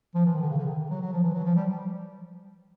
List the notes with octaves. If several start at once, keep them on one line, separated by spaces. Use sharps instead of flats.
F3
E3
D#3
D3
C#3
D3
D#3
F#3
F#3
F3
E3
F#3
F3
G3